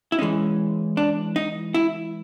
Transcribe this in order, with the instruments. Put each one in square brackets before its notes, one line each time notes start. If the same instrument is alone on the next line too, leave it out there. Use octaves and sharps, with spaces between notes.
[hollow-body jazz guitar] E4
E3 G#3 C#4 D#4
D4
D#4
E4